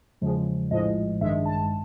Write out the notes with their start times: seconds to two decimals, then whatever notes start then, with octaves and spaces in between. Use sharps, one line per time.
0.21 E2 C#3 F3 G#3
0.71 A#1 A2 F3 G#3 D#5
1.21 A1 G2 D#3 G#3 E5
1.46 A5